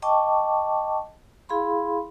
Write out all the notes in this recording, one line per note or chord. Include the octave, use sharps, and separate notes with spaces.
D#5 G5 A5 C#6 D6
E4 G#4 F5 B5 C6